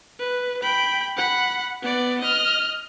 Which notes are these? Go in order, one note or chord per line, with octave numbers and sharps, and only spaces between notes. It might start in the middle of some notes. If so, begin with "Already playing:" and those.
B4
G5 B5
F#5 B5
B3 D5
D#5 F6